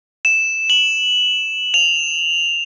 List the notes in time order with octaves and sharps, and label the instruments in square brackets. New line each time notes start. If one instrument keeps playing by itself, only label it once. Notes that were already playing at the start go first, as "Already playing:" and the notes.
[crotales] E7
F#7
F7